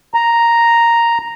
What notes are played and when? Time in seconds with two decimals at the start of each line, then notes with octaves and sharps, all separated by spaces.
0.14 A#5